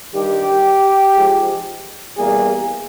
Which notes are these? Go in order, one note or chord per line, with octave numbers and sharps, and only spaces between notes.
G2 D#3 G3 G4
G#2 F3 G#3
E2 B2 G3 A#3 G#4